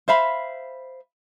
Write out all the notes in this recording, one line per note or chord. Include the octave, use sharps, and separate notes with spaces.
C5 E5 F5 B5